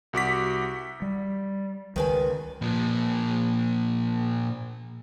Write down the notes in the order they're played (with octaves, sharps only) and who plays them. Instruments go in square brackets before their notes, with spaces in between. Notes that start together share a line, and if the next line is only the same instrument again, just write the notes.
[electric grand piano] C2 F#4 D6 B6
[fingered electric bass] G3
[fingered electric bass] C#2 [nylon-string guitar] D#3 B4 G#5
[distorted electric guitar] A#2 F3